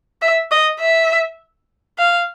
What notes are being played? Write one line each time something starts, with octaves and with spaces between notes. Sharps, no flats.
E5
D#5
E5
F5